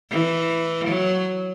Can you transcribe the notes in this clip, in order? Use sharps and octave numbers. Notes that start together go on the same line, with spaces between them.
E3
F#3